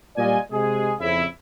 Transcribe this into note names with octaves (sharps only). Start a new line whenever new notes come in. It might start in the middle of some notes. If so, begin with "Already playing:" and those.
A#2 G3 F4 D5 D#5 G#5
C3 G#3 G#4
F2 C#3 E4 E5